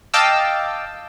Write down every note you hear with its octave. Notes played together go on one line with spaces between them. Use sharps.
D#5 F5 G5 A5 D6 E6